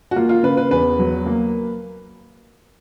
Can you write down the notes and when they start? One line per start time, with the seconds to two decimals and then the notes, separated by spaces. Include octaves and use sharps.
0.11 F#4
0.16 A#3 F4
0.29 F4
0.43 C#3 B4
0.57 B4
0.71 E2 B4
0.99 F#3
1.26 A#3